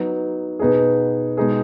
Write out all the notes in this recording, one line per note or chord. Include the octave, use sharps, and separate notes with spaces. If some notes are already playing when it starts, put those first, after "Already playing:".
Already playing: F#3 B3 D#4
B2 B3 D#4 G#4
B2 G#3 D#4 G#4